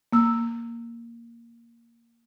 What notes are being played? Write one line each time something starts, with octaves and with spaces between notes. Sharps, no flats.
A#3 E6